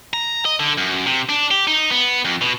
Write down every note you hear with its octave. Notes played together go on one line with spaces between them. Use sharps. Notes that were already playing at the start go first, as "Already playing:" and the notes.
A#5
D#5
D3
F#2
C3
D4
G4
D#4
B3
F2
B2